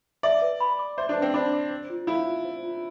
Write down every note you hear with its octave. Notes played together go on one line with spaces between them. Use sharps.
D5 E5
B4
B5
D6
C5 E5
D4
B4
C4
D4 B5
D6
C5
F4
E4 F5
F4
C5
F4